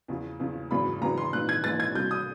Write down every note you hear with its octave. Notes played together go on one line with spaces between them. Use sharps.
E2 C#3 F3
E2 C#3 F3
G#1 F#2 C#3 E3 B5
G#1 F#2 C#3 E3 A#5
C6
A#1 G#2 E3 F#6
G#6
A#1 G#2 E3 A6
G#6
C2 B2 G6
D#6